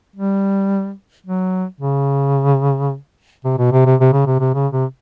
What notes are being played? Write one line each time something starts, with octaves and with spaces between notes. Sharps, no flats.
G3
F#3
C#3
C3
B2
C3
C3
C3
C#3
C3
C3
C#3
C3